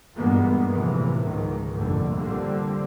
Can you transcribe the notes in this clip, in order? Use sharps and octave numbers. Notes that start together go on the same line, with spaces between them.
G2 A#2 E3 G#3 A#3 B3
A2 C3 E3 F3
C#2 G#2 D#3
F1 A#1 G2 D3 G3
D3 G3 A#3 C4